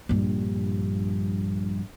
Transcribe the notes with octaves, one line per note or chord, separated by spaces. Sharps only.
A#1 G2